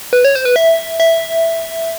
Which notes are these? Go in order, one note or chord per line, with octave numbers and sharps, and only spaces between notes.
B4
C#5
C5
B4
E5
E5